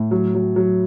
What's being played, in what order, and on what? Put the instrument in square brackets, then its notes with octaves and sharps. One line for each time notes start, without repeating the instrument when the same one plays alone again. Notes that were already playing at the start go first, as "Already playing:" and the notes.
Already playing: [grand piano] A2
F#3
F#3
F#3